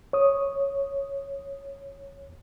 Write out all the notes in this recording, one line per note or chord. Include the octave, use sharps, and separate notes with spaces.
C#5 D#6